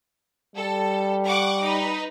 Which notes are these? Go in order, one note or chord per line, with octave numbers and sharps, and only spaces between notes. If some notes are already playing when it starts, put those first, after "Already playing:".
G3 A4
F#5 C#6 D6
D#4 B4